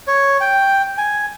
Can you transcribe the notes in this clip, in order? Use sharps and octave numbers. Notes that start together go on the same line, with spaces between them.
C#5
G5
G#5